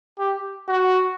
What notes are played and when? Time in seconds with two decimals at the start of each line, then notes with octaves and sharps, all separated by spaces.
0.19 G4
0.68 F#4